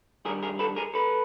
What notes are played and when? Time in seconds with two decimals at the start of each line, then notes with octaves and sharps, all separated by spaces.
0.25 G2 D#3 G3 G#4 A#4
0.43 G#4 A#4
0.59 A4 B4
0.76 G#4 A#4
0.94 A4 B4